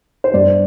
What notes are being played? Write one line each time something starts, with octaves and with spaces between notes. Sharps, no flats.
C5
G2 D5